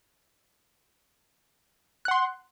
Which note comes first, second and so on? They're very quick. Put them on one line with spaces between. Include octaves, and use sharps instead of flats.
F#6 F#5 C6